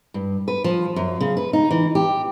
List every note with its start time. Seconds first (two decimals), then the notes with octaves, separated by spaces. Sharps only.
0.14 G2
0.48 B4
0.64 F3
0.96 F#2
1.21 C#3
1.37 B4
1.53 D#4
1.71 E3
1.95 G4